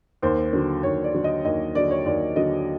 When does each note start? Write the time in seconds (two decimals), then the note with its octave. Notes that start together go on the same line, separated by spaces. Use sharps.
0.22 D#2 C5
0.53 D3 F#3
0.83 D#2 C#5
1.04 D5
1.14 D3 F#3
1.24 D#5
1.45 D#2 D#5
1.75 D3 F#3 D5
1.91 C#5
2.06 D#2 D5
2.36 D3 F#3 D#5